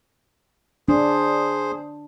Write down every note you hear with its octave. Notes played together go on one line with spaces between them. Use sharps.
D4 G#4 C5